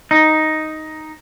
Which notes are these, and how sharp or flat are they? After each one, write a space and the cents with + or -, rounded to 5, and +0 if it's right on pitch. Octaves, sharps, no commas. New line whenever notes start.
D#4 +5